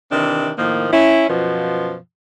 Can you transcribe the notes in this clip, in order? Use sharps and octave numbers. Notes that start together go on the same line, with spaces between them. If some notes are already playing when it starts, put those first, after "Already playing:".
C3 D#3 E3 D4
A2 D#3 F3 A#3
C#4 E4
F#2 B2 F3